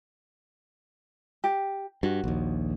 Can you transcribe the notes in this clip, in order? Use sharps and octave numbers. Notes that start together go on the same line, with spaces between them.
G4
G2 F#4
A#1 D#2